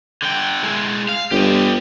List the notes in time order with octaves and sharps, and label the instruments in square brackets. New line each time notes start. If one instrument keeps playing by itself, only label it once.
[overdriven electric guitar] D3 G5
G#3 E4
F5
[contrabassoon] G1 [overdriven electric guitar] G4 D#5